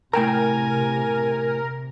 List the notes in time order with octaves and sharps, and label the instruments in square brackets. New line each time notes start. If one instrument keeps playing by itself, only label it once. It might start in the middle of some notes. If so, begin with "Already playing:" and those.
[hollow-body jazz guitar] A2 G5 A#5 [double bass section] C3 [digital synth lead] A#4 [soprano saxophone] G#5